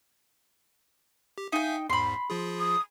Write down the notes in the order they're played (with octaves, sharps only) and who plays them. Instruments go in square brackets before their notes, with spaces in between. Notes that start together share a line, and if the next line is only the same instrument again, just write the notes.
[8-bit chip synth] G4
[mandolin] D#4 G5 [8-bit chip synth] E5 F5 G#5
[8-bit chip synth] E2 G#2 [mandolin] B5 C6
[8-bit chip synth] F3 F4 G#4
[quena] D#6